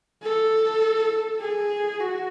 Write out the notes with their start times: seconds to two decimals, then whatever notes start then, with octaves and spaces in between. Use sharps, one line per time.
0.23 A4
1.41 G#4
2.00 F#4